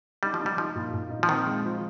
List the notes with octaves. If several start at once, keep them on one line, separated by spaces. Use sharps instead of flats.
G3 D#4
F3
D#4
G3
F3 D#4
A#2
A#2
D#4
F3
D#3 C4
G#3
F3